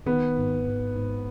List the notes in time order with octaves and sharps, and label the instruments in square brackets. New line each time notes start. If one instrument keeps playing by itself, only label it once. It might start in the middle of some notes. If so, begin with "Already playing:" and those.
[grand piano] D#3 [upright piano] B3
[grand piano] G#1
G#1
G#2